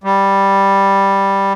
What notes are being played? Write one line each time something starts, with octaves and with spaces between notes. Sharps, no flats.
G3